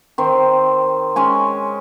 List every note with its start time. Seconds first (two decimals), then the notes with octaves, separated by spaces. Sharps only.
0.18 D#3 C4
1.16 G#3 C#4 G#5